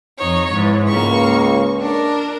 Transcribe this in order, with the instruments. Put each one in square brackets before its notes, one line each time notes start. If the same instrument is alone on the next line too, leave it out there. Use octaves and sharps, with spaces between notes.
[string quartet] F2 D#4 C#5
G#2 E3
[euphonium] C#2 [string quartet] A#3 C#6
[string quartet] D4 A#4